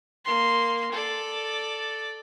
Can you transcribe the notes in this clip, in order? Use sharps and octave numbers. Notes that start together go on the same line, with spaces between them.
A#3 C6
A4 D5